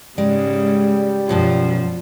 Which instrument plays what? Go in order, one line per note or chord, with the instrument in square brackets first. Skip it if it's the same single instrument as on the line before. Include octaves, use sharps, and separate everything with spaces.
[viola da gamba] G#2 C#3 [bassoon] G3 [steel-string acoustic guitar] G#3
[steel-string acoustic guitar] F#2 B2 F#3 [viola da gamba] F3